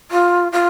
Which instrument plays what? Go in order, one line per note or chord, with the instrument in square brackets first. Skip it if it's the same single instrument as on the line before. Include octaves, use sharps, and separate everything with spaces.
[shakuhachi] F4
F4